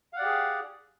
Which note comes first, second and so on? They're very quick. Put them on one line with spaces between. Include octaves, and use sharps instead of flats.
F5 F#5 D5 G4 G#4